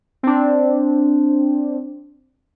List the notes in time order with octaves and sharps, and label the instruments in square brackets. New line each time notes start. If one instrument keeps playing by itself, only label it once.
[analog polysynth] C4 D4